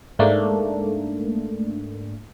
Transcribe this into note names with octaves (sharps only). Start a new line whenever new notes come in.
G#2 A3 A#3 D4